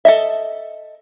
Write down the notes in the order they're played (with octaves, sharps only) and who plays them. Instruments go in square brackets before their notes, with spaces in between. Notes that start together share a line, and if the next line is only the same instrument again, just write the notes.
[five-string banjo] A4 D#5 E5